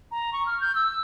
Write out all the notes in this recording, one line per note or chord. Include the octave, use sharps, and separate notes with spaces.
A#5
C#6
F6
G6
E6